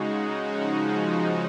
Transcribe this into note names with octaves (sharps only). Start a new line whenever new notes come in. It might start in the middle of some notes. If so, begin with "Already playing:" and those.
Already playing: C#3 G#3 D#4 F#4
C#3 F3 G#3 D#4 F#4